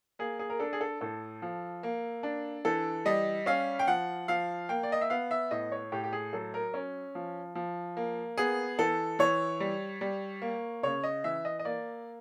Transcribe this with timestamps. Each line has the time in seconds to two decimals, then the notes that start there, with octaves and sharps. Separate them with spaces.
0.19 A#3 G#4
0.39 G#4
0.50 A#4
0.60 D4 A4
0.73 G#4
0.81 A4
1.01 A2 A4
1.42 F3
1.83 A#3
2.23 D4
2.65 E3 A4
3.05 G3 D#5
3.46 C#4 F5
3.79 G5
3.87 F3 F#5
4.28 F3 F5
4.69 A#3 G5
4.83 D5
4.92 D#5
5.01 E5
5.10 B3 F5
5.31 E5
5.51 A2 D#5
5.72 C#5
5.92 A2 G4
6.04 G4
6.13 G#4
6.33 F#3 A4
6.54 A#4
6.74 C#4
7.15 F3
7.55 F3
7.97 A#3
8.38 B3 G#4
8.79 E3 A4
9.19 E3 C#5
9.60 G3
10.01 G3
10.42 A#3
10.83 C#3 C#5
11.03 D#5
11.24 E3 E5
11.45 D#5
11.59 D#5
11.65 A#3 D5